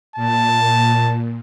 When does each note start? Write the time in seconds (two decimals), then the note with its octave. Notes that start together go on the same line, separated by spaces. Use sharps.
0.16 A#2 A5